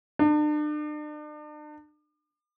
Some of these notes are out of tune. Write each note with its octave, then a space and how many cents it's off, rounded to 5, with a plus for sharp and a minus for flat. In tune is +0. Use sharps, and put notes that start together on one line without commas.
D4 +40